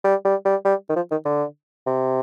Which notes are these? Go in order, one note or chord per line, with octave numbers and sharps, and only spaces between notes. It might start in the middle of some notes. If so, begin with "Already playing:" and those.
G3
G3
G3
G3
D#3
F3
D#3
D3
C3